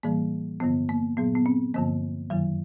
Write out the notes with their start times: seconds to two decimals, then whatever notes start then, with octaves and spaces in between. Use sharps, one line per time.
0.03 A2 E3 G3 A#3
0.60 G2 D3 F3 B3
0.89 A#3
1.17 A#2 F#3 B3
1.35 B3
1.46 C4
1.74 G2 D3 F3 A#3
2.30 F#2 D#3 F#3